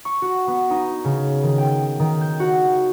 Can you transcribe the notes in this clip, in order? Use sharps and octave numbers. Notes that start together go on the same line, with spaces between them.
C#6
F#4
B3
D#4
C#3
D#3
G5
D#3
G6
F#4